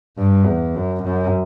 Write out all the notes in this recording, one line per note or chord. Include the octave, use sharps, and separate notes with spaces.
G2
E2
F#2
F#2